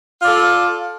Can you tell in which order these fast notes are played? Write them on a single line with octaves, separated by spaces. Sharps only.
F4 D5 A4